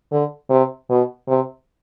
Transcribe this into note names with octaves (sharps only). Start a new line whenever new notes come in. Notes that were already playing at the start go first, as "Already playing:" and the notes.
D3
C3
B2
C3